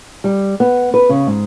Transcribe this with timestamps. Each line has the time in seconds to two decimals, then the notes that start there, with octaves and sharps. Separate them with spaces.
0.24 G3
0.60 B3
0.94 B4
1.09 C#3
1.27 G#2